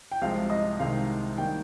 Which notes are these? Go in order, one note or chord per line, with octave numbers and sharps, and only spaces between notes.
G5
C2 C3 F3 G#3 F5
D#5
C2 C3 D#3 G#3 D#4 F5
D#3 G3 A#3 D#4 G5